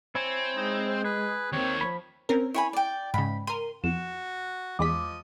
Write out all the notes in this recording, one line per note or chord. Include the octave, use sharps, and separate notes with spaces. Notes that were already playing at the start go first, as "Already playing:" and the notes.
C4 E4 C#5 G#5
G#3 D#4
C5
G#4 B4
D#2 D#3 C4 C#5
F3 B5
C4 C#4 A#4
E4 C#5 G#5 B5
D5 G5
G#2 C#3 B5
A#4 C6 D#7
F2 F#4 E7
E2 F3 G#3 D#5 D6 B6